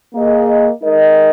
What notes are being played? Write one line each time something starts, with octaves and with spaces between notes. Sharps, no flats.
A#3 G#4 D#5
G#3 D#4 A#4 D#5